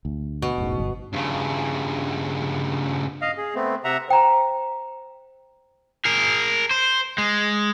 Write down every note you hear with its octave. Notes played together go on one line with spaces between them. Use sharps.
D2
B2
E1 A1 G#2
G1
G2 C#3
D#5 F5
G#4
A3 B3 C4
C3 E5 F#5 A#5
C5 G5 A#5
G#4 A#4
C5
G#3